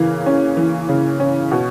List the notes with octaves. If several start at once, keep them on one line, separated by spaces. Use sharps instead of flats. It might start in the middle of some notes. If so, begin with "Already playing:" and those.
Already playing: C#3 E3 A#3
C#4
E3
C#3
C#4
B2